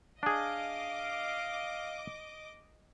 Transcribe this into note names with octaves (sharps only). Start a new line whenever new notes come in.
D4 G#4 D#5 F5 D6